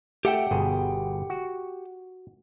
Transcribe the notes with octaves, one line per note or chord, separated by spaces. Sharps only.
A3 G4 E5 F#5 G5
G1 B2 G#4
F#4